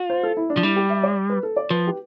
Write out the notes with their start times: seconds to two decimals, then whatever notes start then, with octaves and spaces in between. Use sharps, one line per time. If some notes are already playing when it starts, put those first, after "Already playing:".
Already playing: F4
0.10 C5
0.23 A4
0.37 E4
0.50 D4
0.57 F3
0.63 G3 E4
0.76 G4
0.90 E5
1.03 D5
1.30 B4
1.43 A4
1.56 D5
1.70 F3 B4
1.87 G4